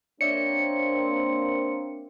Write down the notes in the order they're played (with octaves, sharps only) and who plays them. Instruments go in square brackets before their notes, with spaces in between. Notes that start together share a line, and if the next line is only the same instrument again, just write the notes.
[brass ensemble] A#3 C4 D4 [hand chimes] C#5 D5 E5 [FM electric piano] C#7